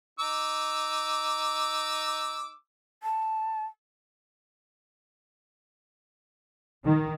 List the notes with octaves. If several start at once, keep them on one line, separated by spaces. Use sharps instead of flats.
D#4 D6 E6
A5
D#3